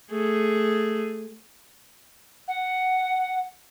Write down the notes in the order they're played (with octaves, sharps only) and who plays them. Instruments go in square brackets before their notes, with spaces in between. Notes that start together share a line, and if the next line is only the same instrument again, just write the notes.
[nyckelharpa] A3 G#4
[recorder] F#5